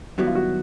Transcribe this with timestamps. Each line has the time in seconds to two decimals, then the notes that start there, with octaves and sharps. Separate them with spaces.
0.18 F#2 D#3 G3 B3 E4 F#4
0.27 F4
0.35 F#4